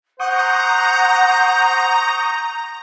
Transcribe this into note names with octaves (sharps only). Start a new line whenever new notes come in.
C5 F#5 A#5 C#6 D#6 G6